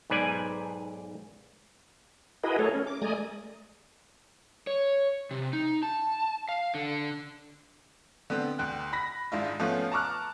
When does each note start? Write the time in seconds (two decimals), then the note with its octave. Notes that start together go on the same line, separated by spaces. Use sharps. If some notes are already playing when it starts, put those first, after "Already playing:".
0.10 B1 G#2 B4 D5 G#5
2.44 E4 F#4 G#4 A#4 B4 D#5
2.59 A3 G#4 A4 C#5
2.74 C#4
2.87 D6
3.02 G#3 A3 D5 G#5 A#5 D#6
4.67 C#5
5.31 C3
5.53 D#4
5.83 A5
6.49 F5
6.75 D3
8.30 D3 B3 C4
8.59 D2 G5 F#6
8.93 B5 A#6 B6
9.32 G#1 G#2 D4 E4 F4
9.60 F3 A3 B3 C#4 F4
9.92 A5 A#5 C#6 D6 F6 F#6